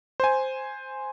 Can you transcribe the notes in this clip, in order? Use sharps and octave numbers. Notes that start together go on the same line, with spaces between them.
C5 G#5